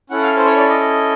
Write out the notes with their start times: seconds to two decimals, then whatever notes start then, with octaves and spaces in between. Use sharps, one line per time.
0.10 C#4 E4 A4 F#5
0.22 F5
0.37 C5
0.45 C#5
0.57 D5
0.69 D#5
0.80 D#5